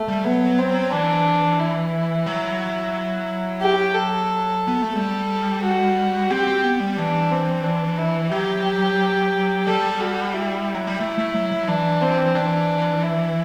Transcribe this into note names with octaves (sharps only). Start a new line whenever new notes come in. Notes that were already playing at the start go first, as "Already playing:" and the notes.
Already playing: A3
G3
F#3 B3
C4
E3 D4
E4
F#3
G4
A4
B3
A3
G3 A4
F#4
C4 G4
C4
B3
G3
E3 D4
C4
D4
E4
F#3 G4
G3 A4
F#4
E4
F#3
G3
A3 E4
A3
F#3
F#3
E3 D4
C4
E3 D4
E4